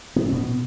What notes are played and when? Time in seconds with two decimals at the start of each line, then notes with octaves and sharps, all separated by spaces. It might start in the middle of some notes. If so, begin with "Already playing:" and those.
0.16 A2 B3
0.24 C4
0.31 B2 B3